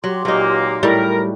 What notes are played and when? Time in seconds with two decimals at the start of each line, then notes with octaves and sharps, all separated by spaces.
0.04 F#3 G4 C6 D6
0.25 C#2 A#2 F#3 A#3 D#4
0.83 A2 G3 A#4